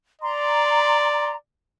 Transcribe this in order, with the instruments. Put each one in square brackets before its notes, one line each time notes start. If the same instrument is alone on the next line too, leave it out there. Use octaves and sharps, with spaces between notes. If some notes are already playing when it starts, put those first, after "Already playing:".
[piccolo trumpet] D5 [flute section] A#5 C6